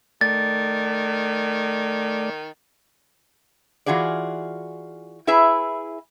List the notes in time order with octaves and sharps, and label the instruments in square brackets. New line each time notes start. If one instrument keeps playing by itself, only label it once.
[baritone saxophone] D#3 [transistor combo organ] A3 D5 [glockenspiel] A6
[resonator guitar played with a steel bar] E3 F4 F#4 G#4 D5
E4 G#4 B4 E5